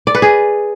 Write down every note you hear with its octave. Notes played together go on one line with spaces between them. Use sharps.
D5
B4
G#4